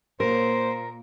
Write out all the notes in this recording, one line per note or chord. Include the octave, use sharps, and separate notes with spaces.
A#2 A#3 A#4 C5